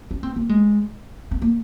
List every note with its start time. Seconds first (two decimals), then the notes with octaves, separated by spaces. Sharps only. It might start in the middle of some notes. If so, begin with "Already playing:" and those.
0.11 C#4
0.23 C4
0.36 A#3
0.49 G#3
1.31 C4
1.42 A#3